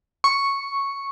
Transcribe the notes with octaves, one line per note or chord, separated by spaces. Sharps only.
C#6